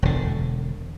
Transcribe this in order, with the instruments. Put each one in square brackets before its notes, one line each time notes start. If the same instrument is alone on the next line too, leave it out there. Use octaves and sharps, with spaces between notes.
[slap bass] E1 D3